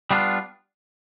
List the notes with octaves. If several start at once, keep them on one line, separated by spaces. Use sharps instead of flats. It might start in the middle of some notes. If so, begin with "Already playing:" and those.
G3 B3 D4 F4